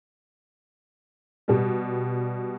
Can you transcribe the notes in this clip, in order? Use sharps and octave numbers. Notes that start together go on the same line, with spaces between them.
B2 G3